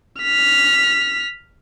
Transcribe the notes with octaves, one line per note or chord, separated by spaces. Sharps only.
F6 B6